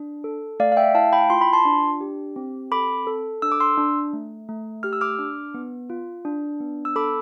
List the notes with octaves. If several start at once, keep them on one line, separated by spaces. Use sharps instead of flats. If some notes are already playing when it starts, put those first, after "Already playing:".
Already playing: D4
A4
A3 D5 F5
F5
E5 G5
E4 F5 A5
G5 B5
F4 C6
B5
A5 C6
D4
G4
C4
A4 B5 D6
A4
D4 E6
D6
C6 E6
D4
A3
A3
G4 F6
E6
D6 F6
D4
B3
F4
D4
B3
E6
A4 B5 D6